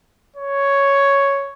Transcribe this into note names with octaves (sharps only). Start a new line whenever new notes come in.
C#5